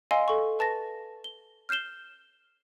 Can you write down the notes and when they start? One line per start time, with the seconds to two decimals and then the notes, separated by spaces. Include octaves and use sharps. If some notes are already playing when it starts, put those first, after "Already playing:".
0.11 D#5 F5 G#5 C6 E6
0.28 A4 C#6
0.59 B4 A5 A6 A#6
1.24 G7
1.69 F6 G6 C7 E7 G7